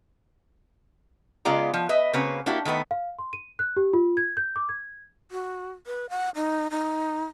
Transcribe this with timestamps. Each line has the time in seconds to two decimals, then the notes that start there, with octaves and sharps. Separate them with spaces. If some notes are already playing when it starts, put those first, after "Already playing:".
1.45 C#3 G#3 B3 F4 D5 A#5
1.74 F3
1.89 B4 D#5 E5
2.13 C#3 A#3 C4 F#4 B4 C#5
2.46 A#3 D4 E4 F#4 G4
2.65 D#3 A3 B3 B4
2.91 F5
3.19 C6
3.33 D#7
3.59 F#6
3.77 G4
3.93 F4
4.17 G#6
4.37 G6
4.56 D6
4.69 G#6
5.31 F#4
5.87 B4
6.10 F#5
6.35 D#4
6.71 D#4